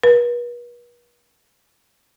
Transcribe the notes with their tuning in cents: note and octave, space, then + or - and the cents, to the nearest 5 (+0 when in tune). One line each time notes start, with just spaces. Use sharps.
B4 -45